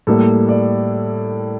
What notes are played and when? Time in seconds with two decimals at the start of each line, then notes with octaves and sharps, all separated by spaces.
0.07 A2 G3 A#3 A4
0.49 D5